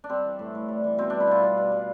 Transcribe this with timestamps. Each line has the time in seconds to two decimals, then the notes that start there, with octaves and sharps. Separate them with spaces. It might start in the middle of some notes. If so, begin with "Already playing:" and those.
0.04 D4
0.10 G3 C4
0.24 E3
0.39 A2
0.55 A2
0.68 G3
0.84 E3
0.98 B2 C4
1.10 G3 D4
1.20 E4
1.27 B2 F4
1.43 G3
1.58 B2
1.72 G3